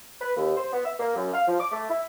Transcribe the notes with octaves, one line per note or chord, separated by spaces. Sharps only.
B4
D#2
C5
B3
E5
A#3
F#2
F5
F3
D6
A3
E4